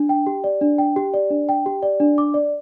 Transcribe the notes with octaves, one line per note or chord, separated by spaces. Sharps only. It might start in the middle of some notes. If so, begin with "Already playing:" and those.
Already playing: D4
G5
G4
D5
D4
G5
G4
D5
D4
G5
G4
D5
D4
D6
D5